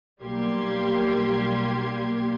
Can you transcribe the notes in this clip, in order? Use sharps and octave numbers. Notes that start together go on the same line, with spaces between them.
B1 G3 A#3 G4 C6 G#6